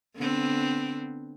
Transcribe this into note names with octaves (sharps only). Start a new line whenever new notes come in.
D3 B3 C4